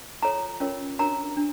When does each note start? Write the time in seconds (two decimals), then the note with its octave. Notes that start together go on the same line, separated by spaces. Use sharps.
0.23 F4 A4 C#5 A#5
0.60 C#4 F4 A#4 C#5
0.99 D4 F#4 A#4 C#5 A#5
1.37 D4